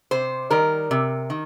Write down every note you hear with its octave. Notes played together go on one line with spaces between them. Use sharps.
C3 C5
D#3 G3 A#4
C3
D#3